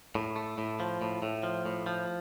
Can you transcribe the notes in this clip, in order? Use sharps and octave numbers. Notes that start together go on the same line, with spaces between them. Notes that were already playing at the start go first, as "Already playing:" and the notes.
A2
A3
A2
F3
A2
A2
F3
A2
F3